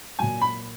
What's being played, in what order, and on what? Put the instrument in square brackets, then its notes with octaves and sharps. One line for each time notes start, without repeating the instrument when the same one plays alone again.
[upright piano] A#2 F#3 G#5
B5